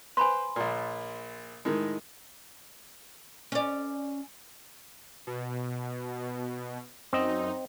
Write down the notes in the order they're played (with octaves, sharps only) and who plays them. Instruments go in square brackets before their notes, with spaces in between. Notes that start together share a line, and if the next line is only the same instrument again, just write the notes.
[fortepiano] B4 C5 [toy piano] G#5 B5 C6
[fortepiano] A#1 A#2
A2 D#3 G#3
[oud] C#4 D5
[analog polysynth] B2
[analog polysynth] F#2 D#4 [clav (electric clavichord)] C4 D#5